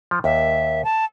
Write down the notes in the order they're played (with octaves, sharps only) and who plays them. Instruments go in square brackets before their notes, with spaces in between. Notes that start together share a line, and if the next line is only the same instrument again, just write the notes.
[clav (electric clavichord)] F3
[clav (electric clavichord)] D#2 [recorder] E5
[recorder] A5